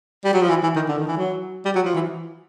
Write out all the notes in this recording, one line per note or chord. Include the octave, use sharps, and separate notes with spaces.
G3
F#3
F3
E3
E3
D#3
D3
D#3
E3
F#3
G3
F#3
F3
E3